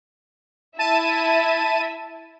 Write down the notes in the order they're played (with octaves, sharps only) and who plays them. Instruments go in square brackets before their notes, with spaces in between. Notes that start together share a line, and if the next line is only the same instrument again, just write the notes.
[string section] E4 E5 [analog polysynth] A5 D#7